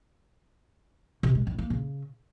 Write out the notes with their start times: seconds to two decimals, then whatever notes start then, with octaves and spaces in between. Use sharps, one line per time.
1.23 C3
1.35 G#3
1.47 G2
1.59 A#3
1.70 C#3